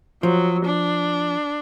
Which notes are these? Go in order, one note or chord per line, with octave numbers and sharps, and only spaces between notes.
F3 F#3
D4